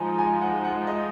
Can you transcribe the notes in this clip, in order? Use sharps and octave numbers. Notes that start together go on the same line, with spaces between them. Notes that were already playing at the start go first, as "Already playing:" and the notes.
Already playing: F3 G#3 D#4 G#5 A#5
G#5
F#5
F#5
D#5